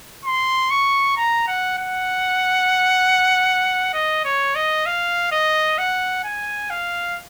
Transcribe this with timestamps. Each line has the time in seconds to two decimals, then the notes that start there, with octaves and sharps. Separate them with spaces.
0.25 C6
0.71 C#6
1.17 A#5
1.48 F#5
1.78 F#5
3.93 D#5
4.25 C#5
4.55 D#5
4.86 F5
5.32 D#5
5.78 F#5
6.24 G#5
6.70 F5